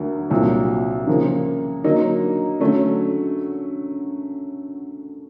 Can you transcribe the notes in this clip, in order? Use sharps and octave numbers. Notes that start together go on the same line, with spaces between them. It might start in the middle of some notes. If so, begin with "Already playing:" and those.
Already playing: D2 D3 F#3 A#3
C2 A#2 F#3
C#3 F3 A#3
D3 F#3 A#3 D#4
D3 F#3 A3 C#4